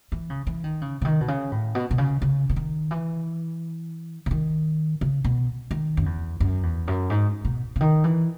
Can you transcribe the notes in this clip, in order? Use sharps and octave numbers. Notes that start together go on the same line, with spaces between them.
E3
C#3
E3
D#3
C#3
C#3
D#3
B2
C#3
A2
B2
B2
C#3
C#3
C#3
D#3
E3
C#3
D#3
C#3
B2
D#3
F#2
E2
F#2
E2
F#2
G#2
B2
C#3
D#3
E3